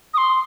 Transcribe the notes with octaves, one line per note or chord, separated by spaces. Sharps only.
D#6
C6